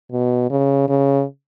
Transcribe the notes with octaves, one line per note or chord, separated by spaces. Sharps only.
B2
C#3
C#3